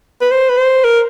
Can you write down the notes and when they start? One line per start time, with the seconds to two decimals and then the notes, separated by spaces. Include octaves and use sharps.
0.21 B4
0.31 C5
0.49 B4
0.57 C5
0.84 A#4